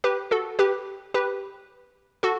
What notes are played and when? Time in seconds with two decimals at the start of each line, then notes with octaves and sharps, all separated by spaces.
0.04 G4 B4
0.31 F#4 A4
0.59 G4 B4
1.14 G4 B4
2.23 F#4 A4